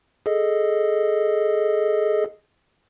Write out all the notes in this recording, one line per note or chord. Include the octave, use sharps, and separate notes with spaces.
G#4 A4 D#5